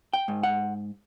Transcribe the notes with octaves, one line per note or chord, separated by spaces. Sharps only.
G5
G#2
F#5